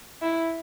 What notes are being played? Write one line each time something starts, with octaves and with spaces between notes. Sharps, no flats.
E4